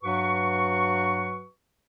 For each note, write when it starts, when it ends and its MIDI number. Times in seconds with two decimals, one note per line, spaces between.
0.03 1.44 43
0.03 1.44 54
0.03 1.44 66
0.03 1.44 71
0.03 1.44 85